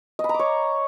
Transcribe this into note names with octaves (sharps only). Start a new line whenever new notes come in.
D#5
B5
A#5
D6
C#5